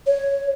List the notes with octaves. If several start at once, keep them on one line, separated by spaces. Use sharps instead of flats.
C#5